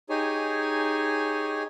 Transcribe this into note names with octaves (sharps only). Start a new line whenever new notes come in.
D#4 G4 G#4 C#5 G#5